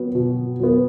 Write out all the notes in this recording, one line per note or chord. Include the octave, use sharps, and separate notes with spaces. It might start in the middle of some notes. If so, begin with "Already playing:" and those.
Already playing: F#3 B3
B2
F#3 B3